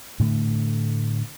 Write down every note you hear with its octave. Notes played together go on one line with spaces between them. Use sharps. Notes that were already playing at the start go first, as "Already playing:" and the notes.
A2 D3 A3